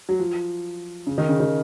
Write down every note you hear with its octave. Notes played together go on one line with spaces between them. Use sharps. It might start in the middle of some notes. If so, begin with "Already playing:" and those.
F#3
F3
C#3
D#3
C#3
D#3